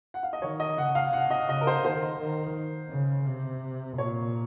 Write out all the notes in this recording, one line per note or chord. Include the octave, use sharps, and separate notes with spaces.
F#5
F5
D#5
D#3 C#5
D#5
C#3 F#5
F5
C3 F#5
D#5
C#3 D#5
A#4
C5
D#3 C5
D#3
C#3
C3
A#2 C#5